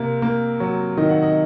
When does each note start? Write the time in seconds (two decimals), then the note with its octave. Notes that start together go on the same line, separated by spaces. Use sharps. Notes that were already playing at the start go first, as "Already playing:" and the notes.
Already playing: C3 A#3
0.22 A#3
0.60 F#3
0.97 D#3 D#5
1.10 F#5
1.23 D#5